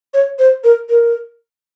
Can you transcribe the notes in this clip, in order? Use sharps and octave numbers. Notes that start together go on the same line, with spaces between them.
C#5
C5
A#4
A#4